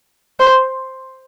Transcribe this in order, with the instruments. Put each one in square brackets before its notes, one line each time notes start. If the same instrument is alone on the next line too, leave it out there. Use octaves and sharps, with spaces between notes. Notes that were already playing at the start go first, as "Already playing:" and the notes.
[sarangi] C5